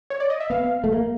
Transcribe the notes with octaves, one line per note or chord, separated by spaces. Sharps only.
C#5
D5
D#5
E5
B3 F5
A3
A#3